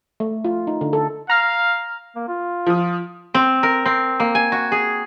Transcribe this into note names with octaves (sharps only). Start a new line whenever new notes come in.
A3
F4
D#4
D3
A4
F5 A#5 F6
A#3
F4
F3 D#6
C4
A#4
C4
A#3
G#5
F#4
G#4